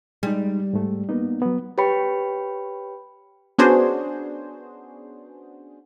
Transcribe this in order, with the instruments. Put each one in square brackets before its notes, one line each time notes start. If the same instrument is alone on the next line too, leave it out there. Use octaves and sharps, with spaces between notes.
[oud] G3 [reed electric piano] G#3 D#4
[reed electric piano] G#2 A3
A#3 B3 D#4
F#3 B3
[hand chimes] G4 B4 C#5 G5 B5 C#7
[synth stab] B3 C#4 D4 F#4 G#4 C5